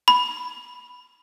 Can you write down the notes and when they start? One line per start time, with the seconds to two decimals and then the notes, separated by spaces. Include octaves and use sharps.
0.08 B5